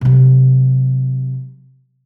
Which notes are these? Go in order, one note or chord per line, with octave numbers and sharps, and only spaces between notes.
C3 F#3